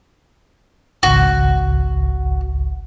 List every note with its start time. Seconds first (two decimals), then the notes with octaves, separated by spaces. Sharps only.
1.03 G#1 C#2 F#4